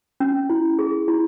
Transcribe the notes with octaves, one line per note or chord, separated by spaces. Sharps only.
C#4
E4
G#4
E4